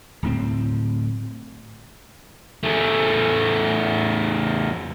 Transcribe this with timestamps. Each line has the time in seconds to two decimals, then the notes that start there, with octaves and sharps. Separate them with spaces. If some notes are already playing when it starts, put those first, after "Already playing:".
0.22 D1 A2 C4
2.63 E2 A3